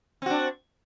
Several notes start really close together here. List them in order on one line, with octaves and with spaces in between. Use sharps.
C4 F#4 D4